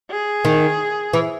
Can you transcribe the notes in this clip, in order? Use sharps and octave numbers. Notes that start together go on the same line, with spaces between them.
G#4
D#3
E3